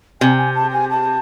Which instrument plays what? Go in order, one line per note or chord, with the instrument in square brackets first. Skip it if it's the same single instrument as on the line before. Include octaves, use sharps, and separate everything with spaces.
[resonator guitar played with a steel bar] C3 [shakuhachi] G#5
[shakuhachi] G#5
A5
G#5
A5